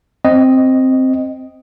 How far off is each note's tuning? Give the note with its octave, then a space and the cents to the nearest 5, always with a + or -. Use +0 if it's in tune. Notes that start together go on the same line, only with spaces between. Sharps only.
C4 +0 D#5 +0